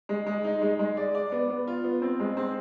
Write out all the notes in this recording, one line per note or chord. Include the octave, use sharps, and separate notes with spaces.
G#3
G#3
D#4
G#3
G#3
D5
D5
B3
B3
F4
B3
C4
G#3
C4